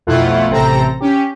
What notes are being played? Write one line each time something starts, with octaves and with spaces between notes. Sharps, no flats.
B1 F2 A3 E4 F4 F#5
A1 C3 C4 A4 A#5 A#6
C#4 G4